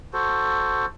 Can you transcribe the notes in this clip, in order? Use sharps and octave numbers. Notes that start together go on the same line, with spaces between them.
F#4 A4 C5